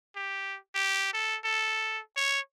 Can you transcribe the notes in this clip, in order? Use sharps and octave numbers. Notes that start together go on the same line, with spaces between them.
G4
G4
A4
A4
C#5